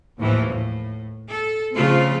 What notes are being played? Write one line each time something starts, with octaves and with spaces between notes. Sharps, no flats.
D#2 A2 E3 F3
A2
A4
C#3 F3 A3 C4 F4